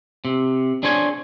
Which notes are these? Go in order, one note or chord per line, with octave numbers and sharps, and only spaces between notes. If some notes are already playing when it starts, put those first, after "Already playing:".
C3
D4 G#4 C5 C#5 G5 G#5